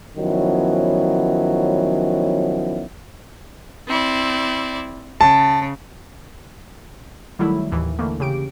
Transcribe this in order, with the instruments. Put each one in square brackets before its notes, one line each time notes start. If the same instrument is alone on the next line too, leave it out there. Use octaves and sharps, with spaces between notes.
[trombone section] D#3 F3 F#3 B3 C#4 E4
[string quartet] C4 E4 D5
[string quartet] C#3 [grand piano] A5
[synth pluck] D#3 F#3 G3 A3 E4
D#2 A2 E3
D3 E3 A3 A#3
C#3 G4 D7